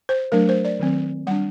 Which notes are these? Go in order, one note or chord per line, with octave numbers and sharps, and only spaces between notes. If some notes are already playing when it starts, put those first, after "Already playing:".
C5
F#3 A3 D4 A#4
C5
D5
D#3 F#3 C4
G3 D4 F#5